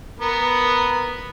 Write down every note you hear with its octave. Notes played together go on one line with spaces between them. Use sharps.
B3 A#4 B5